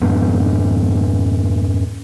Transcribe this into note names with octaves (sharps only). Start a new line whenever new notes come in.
F2 G#2 B3 D4